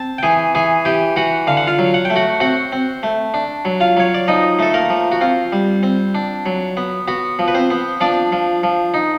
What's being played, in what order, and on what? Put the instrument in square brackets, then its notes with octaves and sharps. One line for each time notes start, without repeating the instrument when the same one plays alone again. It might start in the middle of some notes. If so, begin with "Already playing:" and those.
Already playing: [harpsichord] C4 A5
G5
E3 G#4 G#5
E3 G#4 G#5
E3 G4 G5
E3 F#4 F#5
D3 F5
F#5
F4 F5
F#3
F#5
A3 G5
F#4 F#5
C4 F#4 F#5
C4
A3
D4
F#3
F4 F5
F#3 C#5
D5
F3 D#4 D#5
A3 A4
A#3 A#4
F3
F#4
C4 F4
G3
C4
D4
F#3
B3
B3 F#4
F3
B4
C4 C5
B3
F3 D4 D5
F3
F3
D#4